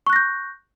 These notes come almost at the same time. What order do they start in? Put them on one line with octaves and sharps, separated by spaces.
C#6 F#6 A#6 G6